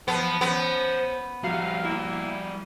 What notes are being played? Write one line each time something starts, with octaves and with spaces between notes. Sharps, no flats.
B3 C5 A5
B3 C#4
G3 D#4 E4 F#4 F5
A#3 E4